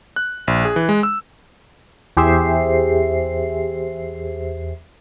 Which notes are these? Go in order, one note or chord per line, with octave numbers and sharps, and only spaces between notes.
F#6
A#1
G#4
E3
G#3
E6
E2 G4 G#4 C5 E5 C7